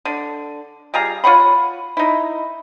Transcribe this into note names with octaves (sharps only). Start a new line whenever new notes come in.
D3
G3 F4 G#4 A#5
F4 C#5 F#5 B5
D#4 E4